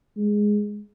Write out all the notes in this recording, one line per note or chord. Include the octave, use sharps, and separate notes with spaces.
G#3